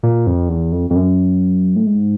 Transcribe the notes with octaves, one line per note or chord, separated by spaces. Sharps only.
A#2
F2
E2
F2
F2
F#2
A2
G#2